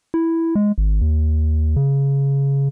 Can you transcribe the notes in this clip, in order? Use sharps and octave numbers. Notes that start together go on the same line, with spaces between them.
E4
G#3
G#1
D#2
C#3